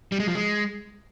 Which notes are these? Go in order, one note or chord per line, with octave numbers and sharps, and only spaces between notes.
G3
G#3
F3
G#3